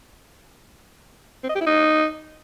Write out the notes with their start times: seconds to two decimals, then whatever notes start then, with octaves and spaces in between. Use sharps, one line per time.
1.43 C4
1.49 D#5
1.55 G4
1.61 E4
1.67 D#4